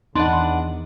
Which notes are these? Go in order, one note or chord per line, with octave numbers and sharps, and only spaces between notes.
E2 D4 D#4 B4 F#5 C6